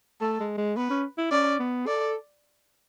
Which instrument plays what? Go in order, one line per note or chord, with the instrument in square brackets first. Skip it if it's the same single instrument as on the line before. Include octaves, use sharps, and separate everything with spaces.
[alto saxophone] A3 [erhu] A4
[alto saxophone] G#3
G#3
[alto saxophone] B3 [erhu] B4
[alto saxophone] C#4
E4
[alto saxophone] C#4 [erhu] D5
[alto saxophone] B3
[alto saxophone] A4 [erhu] D5